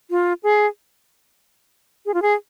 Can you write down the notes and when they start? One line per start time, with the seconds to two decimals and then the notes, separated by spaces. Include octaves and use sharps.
0.10 F4
0.43 G#4
2.06 G#4
2.14 F4
2.22 G#4